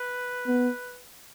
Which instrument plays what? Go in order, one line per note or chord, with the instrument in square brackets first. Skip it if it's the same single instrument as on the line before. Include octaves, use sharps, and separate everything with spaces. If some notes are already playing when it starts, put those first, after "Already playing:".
Already playing: [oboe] B4
[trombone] B3